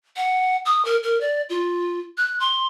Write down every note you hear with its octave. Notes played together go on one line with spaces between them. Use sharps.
F#5
D#6
A#4
A#4
D5
F4
F#6
C6